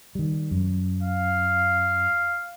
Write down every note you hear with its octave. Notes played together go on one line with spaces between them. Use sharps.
D#3 G3
F#2
F5